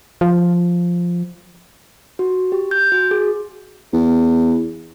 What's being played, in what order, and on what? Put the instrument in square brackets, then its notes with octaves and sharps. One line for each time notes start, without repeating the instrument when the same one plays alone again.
[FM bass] F3
[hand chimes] F#4
G4
G6
F#4
G#4
[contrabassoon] E2